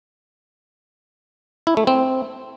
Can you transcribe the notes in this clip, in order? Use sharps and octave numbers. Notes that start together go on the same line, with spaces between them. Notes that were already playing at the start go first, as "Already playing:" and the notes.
E4
A3
C4